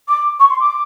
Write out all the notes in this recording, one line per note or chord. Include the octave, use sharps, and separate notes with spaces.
D6
C#6
C6
D6